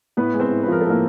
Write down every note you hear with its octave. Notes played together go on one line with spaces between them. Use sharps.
A2 B3 B4
G#3
C4 C5
A2
B4
F3 A#4
A4
A2 A#3 A#4